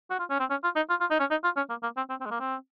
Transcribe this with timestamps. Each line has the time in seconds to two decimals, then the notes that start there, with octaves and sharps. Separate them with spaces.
0.10 F#4
0.19 F4
0.30 C#4
0.40 C4
0.50 C#4
0.64 F4
0.76 D#4
0.90 F4
1.00 F4
1.10 D#4
1.20 C#4
1.31 D#4
1.44 F4
1.57 C#4
1.69 A#3
1.83 A#3
1.97 C4
2.10 C4
2.21 C4
2.26 G#3
2.31 A#3
2.40 C4